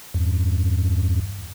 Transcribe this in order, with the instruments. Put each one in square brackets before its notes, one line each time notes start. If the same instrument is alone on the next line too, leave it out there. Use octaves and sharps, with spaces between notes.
[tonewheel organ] E2 G2